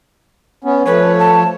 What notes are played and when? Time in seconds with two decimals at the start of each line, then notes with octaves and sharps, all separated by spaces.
0.64 B3 C#4
0.85 F3 A3 B4 C#5
1.19 A5